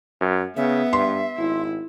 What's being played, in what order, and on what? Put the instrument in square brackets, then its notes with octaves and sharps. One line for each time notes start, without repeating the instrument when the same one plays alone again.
[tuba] F#2
[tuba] C#3 [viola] B3 [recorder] E5
[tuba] G2 [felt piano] C6
[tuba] G#1 [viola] E4